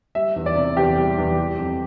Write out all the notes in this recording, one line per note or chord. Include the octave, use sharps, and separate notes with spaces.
G3 E5
E2
D5
C3
E2 G4
G3
E2
G3
F2